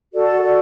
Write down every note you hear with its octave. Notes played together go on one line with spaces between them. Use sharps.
F#4 A4 D5
F#4 A4 D5